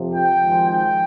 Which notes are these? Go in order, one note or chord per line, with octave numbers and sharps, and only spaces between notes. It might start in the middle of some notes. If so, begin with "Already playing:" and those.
Already playing: F2 C3 F3
G5
G#1 G#2 F3 G#3
G5